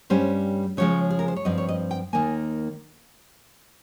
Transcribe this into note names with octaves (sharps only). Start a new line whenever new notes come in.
G2 G3 C#4 C5
C#3 F3 G#3 C#5
G#4
A#4
C5
C#5
G2 F3 C4 D#5
C#5
D#5
G5
D#2 D#3 A#3 G#5